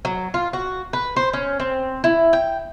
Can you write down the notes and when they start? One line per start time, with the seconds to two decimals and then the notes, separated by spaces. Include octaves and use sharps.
0.05 F#3
0.34 F4
0.53 F#4
0.93 B4
1.16 C5
1.33 C#4
1.60 C4
2.04 E4
2.33 G5